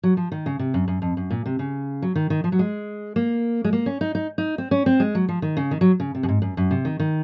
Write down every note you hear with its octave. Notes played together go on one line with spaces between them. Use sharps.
F#3
F3
D#3
C#3
C3
F#2
F#2
F2
F#2
A#2
C3
C#3
F#3
D#3
D#3
F3
F#3
G#3
A#3
G#3
A#3
C#4
D#4
D#4
D#4
C4
C#4
C4
G#3
F#3
F3
D#3
C#3
D#3
F#3
C#3
C3
F#2
G#2
F#2
F#2
C3
D#3
D#3